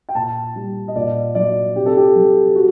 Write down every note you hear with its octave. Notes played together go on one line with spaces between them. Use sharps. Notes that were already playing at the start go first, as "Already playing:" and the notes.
G5
A#2 A5
G3
D#5
A#2 D5
F#3 D5
C3 G4
A4
G4
F#3
F#4